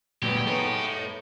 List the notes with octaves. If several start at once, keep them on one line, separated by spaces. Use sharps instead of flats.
D2 G2 A#2 F#3 B3 G4
G#3 B3 D#4 A4 C#5